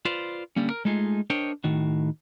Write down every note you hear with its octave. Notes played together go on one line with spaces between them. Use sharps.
F4 B4 C5 D5 F5
D3 G3 A#3 C#4
A#4
G#3 A3 D#4 F4 G#4
D4 A#4 C5 C#5 D#5 G5
A2 D#3 F#4